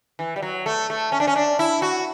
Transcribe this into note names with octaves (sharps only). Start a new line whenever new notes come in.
E3
G3
F#3
A3
A3
C#4
D4
C#4
D4
E4
F#4